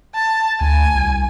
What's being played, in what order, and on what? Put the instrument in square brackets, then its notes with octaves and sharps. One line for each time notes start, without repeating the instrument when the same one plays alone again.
[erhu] A5
[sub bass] D2 [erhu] G#5
[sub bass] C2